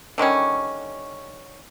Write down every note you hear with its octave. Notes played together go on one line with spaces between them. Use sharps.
D3 D#3 G3 C#4